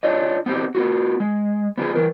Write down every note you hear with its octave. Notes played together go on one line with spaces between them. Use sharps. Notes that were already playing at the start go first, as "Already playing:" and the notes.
D4 F4 C#5 D#5
B3 C4 D#4 G4
B3 F4 F#4
G#3
B3 F4 G4 G#4
E3 A#4